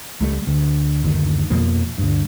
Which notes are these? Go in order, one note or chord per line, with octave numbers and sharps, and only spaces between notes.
C#2 G3 A3
D2
F#1 D2 D#3
F2 B2 F3 A#3
D2 G2